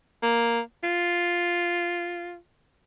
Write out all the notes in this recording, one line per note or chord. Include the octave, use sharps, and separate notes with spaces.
A#3
F4